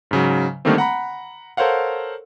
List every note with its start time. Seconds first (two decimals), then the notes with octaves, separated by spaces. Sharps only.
0.11 G#2 C#3 F#3
0.65 D3 D#3 G3 A3 A#3 C4
0.78 F#5 A#5 B5
1.57 A4 A#4 C5 C#5 F5 F#5